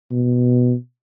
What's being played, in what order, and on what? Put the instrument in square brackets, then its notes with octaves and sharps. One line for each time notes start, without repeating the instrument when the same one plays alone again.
[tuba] B2